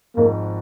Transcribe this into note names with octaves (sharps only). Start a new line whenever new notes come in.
G#1 G#2 F3 A#3